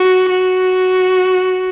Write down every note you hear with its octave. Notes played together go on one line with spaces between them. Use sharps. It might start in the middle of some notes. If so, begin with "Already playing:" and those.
Already playing: F#4
F#4